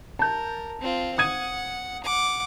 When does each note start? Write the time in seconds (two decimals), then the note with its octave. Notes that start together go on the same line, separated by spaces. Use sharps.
0.19 A#4 A5 G6
0.80 C4 F4
1.18 F#5 D#6 G#6 D#7
2.04 F#5 D6